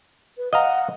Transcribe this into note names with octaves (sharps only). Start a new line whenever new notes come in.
B4
D#5 F5 F#5 A#5